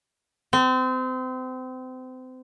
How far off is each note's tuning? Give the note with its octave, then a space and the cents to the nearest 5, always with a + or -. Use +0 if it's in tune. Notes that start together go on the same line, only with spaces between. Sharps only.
C4 -30